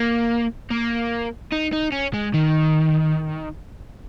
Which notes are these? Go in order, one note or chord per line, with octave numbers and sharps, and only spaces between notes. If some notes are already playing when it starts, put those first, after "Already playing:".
Already playing: A#3
A#3
D#4
D#4
C#4
G#3
D#3